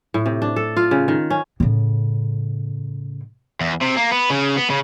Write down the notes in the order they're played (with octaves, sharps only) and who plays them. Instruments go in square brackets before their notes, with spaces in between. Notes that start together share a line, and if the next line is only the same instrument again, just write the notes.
[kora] A2
C3
D4
A4
F4
C#3
D#3
C#4
[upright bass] A2 C#3
[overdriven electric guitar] E2
C3
A#3
B3
C#3
B3
C#3